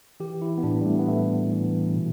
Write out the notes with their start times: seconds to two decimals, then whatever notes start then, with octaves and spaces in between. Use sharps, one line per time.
0.20 E3 G4
0.42 E4
0.58 B3
0.63 A2 D4
0.81 G3
0.86 A3
0.99 B3
1.08 A2 A3
1.52 E3
1.96 B2